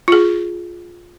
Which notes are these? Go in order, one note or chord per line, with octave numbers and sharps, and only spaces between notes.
F4 G#4